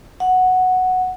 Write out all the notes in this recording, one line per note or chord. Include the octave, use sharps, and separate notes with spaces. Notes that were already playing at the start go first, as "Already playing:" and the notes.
F#5